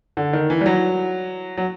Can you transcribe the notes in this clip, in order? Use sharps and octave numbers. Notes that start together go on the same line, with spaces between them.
D3
D#3
E3
G3
F#3
F#3